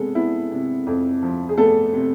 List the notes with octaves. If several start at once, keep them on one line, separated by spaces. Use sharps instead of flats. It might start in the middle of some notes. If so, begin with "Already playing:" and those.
Already playing: C3 G#3 B3 G#4 A4
B3 E4
C3
F2
F3
G#4
A3 B3 A4
C3